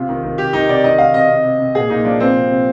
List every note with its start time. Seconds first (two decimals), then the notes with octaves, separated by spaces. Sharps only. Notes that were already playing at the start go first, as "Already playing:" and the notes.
Already playing: C3 F4
0.09 D#3
0.23 D#3
0.38 C3 G4
0.53 D#3 D#4
0.69 C3 D5
0.84 D#3 D#5
0.98 D#3 F5
1.14 C3 D#5
1.29 C3
1.44 C3
1.59 C3
1.75 A#2 G#4
1.90 A#2 D#4
2.05 F3 D4
2.20 F3 C4
2.35 C3
2.50 C3